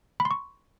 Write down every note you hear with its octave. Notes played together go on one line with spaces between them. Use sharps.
B5
C6
C#6